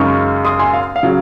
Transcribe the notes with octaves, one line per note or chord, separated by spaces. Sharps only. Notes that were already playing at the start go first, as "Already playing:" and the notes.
Already playing: F#2 C#3 G#3 D#4 C#6 F6
C6 D#6
G#5 C6
F5
F5
C#3 F#3